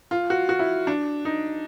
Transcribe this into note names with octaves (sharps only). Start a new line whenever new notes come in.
F4
F#4
F#4
E4
D4
D#4